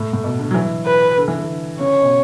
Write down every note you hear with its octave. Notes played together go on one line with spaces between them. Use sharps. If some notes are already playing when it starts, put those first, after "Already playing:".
Already playing: A2
A2
B2
D3
F#3
E3
B4
D3
E3
D3
C#3 C#5
B2